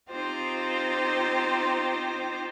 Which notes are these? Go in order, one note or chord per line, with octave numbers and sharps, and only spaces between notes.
C4 D#4 F4 G4 C5